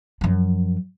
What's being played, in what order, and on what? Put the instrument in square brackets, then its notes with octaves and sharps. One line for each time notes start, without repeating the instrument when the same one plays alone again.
[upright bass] F#2 F3